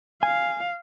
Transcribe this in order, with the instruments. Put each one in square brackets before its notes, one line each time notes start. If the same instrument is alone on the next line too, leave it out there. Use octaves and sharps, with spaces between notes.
[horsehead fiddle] F5 [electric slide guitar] G#5